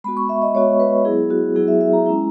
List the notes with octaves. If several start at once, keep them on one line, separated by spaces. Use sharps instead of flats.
G#3 B3 F#4 B5
C#6
E5
D#5
G#3 B3 F#4 C#5
B4
F#3 B3 E4 G#4
F#4
F#3 B3 E4 G#4
E5
E5
A#5
G#3 C#4 E4 A#5